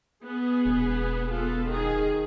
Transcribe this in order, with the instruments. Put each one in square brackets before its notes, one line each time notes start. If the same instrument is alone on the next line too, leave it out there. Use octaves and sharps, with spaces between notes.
[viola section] B3 G#4
[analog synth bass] E1
[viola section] B3 F4 A4
D#3 G#4